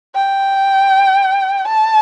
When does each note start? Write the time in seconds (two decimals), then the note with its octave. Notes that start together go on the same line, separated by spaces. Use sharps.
0.15 G5
1.67 A5